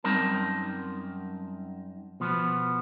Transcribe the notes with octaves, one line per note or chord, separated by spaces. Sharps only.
F#2 G3 C4 D#4 A#4 A5
B2 F3 B3